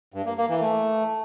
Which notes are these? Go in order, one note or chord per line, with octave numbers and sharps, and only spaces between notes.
G2
A#3
A#3
E3
A3